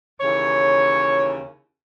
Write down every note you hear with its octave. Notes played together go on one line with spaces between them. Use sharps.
D#2 C#3 E3 C#5